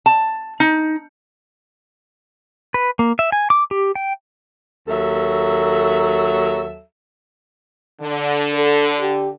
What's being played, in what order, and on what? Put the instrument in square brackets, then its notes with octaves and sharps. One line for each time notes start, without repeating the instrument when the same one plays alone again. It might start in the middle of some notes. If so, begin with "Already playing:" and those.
[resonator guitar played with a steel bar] A5
D#4
[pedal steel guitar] B4
A#3
E5
G#5
D6
G4
G5
[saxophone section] D#2 F#3 A4 E5
[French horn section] D3
[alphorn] A4
G4